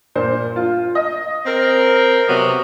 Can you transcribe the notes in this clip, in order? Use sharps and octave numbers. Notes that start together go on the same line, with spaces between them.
G2 A#2 C5
F4
D#5
C4 A#4
C3 F#3 B3